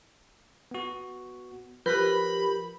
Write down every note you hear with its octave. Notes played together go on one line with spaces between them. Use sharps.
B3 F#4
F3 G4 A#4 B4 B5 G6